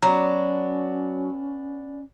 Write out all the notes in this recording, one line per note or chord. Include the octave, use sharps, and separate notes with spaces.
F#3 B3 C#4 D4 A#5